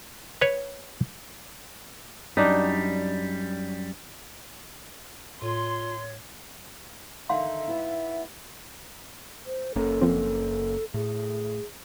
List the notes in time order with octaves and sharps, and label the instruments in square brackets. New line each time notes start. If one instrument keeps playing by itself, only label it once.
[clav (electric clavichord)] B4 C#5
[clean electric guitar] F#2 G3 [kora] D4 D#4
[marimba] A2 [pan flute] F4 [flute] C#5 [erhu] C6
[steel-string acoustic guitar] D3 D#3 D#4 [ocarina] E5 [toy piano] F5 C6
[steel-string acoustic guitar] G#2 B3 E4
[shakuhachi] C5
[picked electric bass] F#1 A#3 C#4 [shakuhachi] A4
[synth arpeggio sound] F3 C4
[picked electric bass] A2 [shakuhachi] G#4